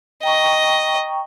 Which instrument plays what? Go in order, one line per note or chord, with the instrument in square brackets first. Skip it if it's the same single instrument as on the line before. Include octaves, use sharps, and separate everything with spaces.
[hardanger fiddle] D#5 [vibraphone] G5 A#5 C#6